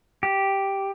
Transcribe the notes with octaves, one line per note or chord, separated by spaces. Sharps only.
G4